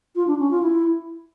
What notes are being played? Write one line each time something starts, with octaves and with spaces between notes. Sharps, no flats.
F4
D4
C#4
F4
E4